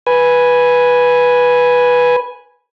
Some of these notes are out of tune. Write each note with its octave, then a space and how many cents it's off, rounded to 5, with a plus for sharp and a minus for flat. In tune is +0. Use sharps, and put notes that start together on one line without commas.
B4 -10 G#5 +0